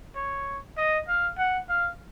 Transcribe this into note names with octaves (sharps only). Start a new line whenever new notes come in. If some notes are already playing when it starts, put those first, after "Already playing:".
C#5
D#5
F5
F#5
F5